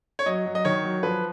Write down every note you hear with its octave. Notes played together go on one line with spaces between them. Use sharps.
C#5
F#3 D#5
F#3
D#5
D#3 C#5
F#3
F3 B4